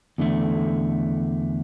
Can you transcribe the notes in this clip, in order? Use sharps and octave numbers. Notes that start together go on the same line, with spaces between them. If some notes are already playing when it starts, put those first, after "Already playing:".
E2 D3 A3